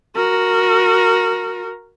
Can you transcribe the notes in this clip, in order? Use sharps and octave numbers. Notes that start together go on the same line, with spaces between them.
F#4 A#4